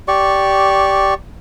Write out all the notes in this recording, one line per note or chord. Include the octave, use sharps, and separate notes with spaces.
G4 D5 C#6